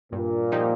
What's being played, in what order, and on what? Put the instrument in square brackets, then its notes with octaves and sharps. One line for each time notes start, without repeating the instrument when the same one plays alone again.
[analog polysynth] G2 [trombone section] A#2
[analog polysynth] F3 A#3 D#4 G4